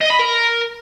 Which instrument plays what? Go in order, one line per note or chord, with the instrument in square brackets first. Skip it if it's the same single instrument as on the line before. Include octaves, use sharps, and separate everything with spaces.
[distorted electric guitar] D#5
B5
A#4